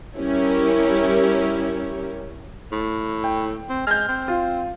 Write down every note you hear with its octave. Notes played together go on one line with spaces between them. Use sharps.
G3 C#4 E4 G4 A#4 C#5
A2
G5
C4
G#3 F6 G6
C4
F4